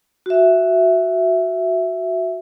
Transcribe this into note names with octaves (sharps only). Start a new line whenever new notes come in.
F#4 E5